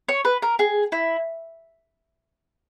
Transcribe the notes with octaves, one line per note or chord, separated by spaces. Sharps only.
C#5
B4
A#4
G#4
E4